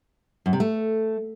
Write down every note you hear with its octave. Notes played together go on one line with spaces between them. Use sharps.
F#2
C3
A3